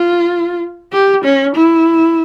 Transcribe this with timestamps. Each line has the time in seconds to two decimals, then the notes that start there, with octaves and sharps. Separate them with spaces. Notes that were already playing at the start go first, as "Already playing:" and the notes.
Already playing: F4
0.93 G4
1.24 C#4
1.55 E4